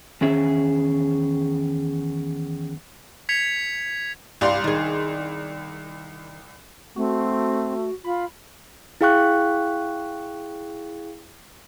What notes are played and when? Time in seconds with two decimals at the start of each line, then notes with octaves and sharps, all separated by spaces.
0.21 E2 D#3 C#4 G#4 E5
3.29 G#6 B6 C#7 F7
4.41 C2 G2 G3 D5 F5 C6
4.64 D#3 G#4
6.96 A3 C4 F#4
8.05 F4 B5
9.01 E4 G#4 F5 G5 C#6 F#6